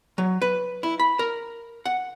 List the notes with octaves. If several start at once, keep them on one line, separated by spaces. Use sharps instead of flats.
F#3
B4
E4
B5
A#4
F#5